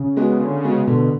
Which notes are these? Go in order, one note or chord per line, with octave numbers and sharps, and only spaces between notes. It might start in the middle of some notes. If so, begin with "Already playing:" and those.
Already playing: C#3
G#3 B3 F#4
D3
G#3 B3 F#4
B2 D3